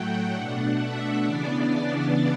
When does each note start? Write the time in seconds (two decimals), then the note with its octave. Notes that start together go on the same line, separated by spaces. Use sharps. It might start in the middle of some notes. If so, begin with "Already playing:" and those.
Already playing: A2 F#3 A3 F#5 G5
0.32 B2 A3 D4
0.78 E5
1.25 C#3 E3 B3 D4 D5